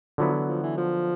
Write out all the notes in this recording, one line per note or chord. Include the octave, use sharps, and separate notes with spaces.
D3 F3 F#3 B3 E4
E3
F3
E3
F3